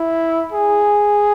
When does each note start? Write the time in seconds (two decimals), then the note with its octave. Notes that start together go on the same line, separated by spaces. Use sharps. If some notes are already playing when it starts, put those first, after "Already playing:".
Already playing: E4
0.52 G#4